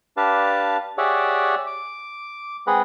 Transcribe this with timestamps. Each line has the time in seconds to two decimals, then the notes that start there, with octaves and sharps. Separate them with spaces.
0.17 D4 G4 B4 F5 A5
0.98 G4 G#4 C#5 D5 E5 F#5
1.67 D6
2.67 G#3 C4 G#4 B4 D#5 F#5